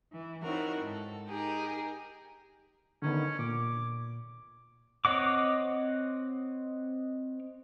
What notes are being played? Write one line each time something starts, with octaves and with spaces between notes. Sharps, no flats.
E3
C4 D#4 E4 F#4 A#4 C#5
G#2 A4
D#4 G4 G#4 A#4
D3 D#3 B3 C#4
A#2 D6
C4 C#5 D#5 F#5 D6